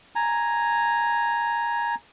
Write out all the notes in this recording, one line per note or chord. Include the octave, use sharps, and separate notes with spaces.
G#5 A#5